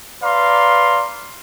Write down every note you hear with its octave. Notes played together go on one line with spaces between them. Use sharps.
B4 D5 F5 A#5 C6